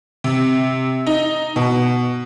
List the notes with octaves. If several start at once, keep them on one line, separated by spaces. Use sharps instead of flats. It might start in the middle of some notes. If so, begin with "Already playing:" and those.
C3
D#4
B2